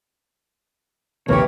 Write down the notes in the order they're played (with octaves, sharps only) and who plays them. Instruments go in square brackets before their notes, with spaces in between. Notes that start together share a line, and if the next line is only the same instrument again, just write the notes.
[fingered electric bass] A#1 D#2 C3 [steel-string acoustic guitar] E3 G4 [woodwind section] A#4 C#5